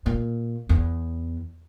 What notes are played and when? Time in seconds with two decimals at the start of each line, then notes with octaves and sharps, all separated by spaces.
0.06 A#2
0.69 E2